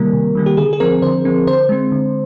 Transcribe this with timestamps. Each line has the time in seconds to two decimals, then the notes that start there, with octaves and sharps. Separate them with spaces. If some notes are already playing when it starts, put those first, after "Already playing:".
Already playing: C3 D#3 G3 A#3 A#4
0.13 C3
0.35 D#3 G3 A#3
0.46 G4
0.57 D3 G#4
0.73 G#4
0.80 F3 C4 A#4
1.02 D3 C5
1.25 F3 C4
1.47 D3 C5
1.69 G#3 C4
1.92 D3